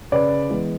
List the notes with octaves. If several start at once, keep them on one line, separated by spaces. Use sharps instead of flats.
C#3 B4 D5
E3 G#3 B3